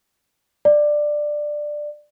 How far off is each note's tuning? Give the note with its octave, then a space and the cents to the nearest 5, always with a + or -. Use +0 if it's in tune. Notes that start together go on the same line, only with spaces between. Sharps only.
D5 +10